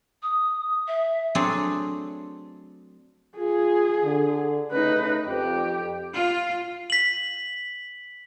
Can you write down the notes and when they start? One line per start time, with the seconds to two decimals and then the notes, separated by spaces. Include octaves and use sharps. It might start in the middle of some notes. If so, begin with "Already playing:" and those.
0.22 D#6
0.87 E5
1.35 F#3 A3 C4 D4 G#4 A4
3.37 F4 G#4
4.03 D3
4.72 C#3 A3 C#4 D#4 B4
5.27 F2 G4
6.15 F4
6.90 B6 F#7